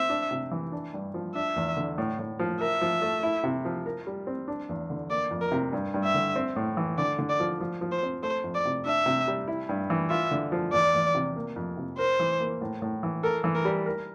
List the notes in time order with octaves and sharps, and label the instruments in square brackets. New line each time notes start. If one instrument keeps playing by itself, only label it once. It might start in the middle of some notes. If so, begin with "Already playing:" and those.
Already playing: [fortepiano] C4 [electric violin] E5
[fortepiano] D4
C3
E3
D4
G2
F3
[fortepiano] D4 [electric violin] E5
[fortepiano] E2
D3
A2
A2
F3
[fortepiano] A#4 [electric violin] E5
[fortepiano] F3
A3
E4
C3
F3
A#4
G3
C4
D4
E2
D3
[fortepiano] A#3 [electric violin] D5
[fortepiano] F2
[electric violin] A#4
[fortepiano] C3
G2
G2
[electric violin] E5
[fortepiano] D3
C4
A2
E3
[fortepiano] D3 [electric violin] D5
[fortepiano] D3
[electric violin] D5
[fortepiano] F3
F3
F3
[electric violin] C5
[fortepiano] C4
[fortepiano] A3 [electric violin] C5
[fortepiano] F2
[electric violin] D5
[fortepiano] C3
[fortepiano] D4 [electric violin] E5
[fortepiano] C3
G3
E4
G2
E3
[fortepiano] F4 [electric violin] E5
[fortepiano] D3
F3
[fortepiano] E2 [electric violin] D5
[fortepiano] E2
C3
A#3
F2
C3
[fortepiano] A#4 [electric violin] C5
[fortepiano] E3
A#3
A2
A2
E3
[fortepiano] A4 [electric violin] A#4
[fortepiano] E3
[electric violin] A#4
[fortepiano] G3
A#4